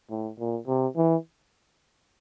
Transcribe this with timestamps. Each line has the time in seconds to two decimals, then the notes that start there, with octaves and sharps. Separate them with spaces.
0.10 A2
0.39 A#2
0.67 C3
0.96 E3